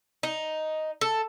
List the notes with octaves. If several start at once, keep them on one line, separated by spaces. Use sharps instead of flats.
D#4
A4